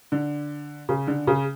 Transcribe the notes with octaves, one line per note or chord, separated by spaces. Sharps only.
D3
C#3
D3
C#3